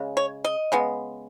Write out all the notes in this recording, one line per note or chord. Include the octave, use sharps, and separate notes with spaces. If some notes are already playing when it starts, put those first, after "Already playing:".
Already playing: C#3 G#3
C#5
D#5
C#3 G#3 B3